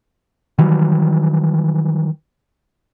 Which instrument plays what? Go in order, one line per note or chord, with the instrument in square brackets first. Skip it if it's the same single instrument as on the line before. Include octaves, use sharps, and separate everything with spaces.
[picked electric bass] D#3 E3 F#3 G3